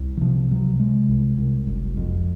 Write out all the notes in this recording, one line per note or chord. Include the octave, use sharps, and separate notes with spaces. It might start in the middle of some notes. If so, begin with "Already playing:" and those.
Already playing: C2
D#3
C3 F3
C3 F#3
C3 G#3
C2
C2
F#1
F2